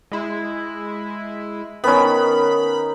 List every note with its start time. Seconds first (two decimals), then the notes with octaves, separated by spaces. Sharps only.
0.12 G#3 E4
1.84 D#3 B3 C#4 D#4 B5